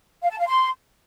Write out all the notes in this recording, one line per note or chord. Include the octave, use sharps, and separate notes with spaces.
F5
A5
F5
C6